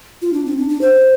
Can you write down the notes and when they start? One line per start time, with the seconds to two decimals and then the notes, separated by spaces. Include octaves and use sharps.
0.22 F4
0.33 D4
0.46 C4
0.57 D4
0.69 D4
0.81 C5